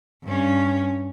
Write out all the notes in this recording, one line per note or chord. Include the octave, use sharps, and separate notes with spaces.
G2 C#4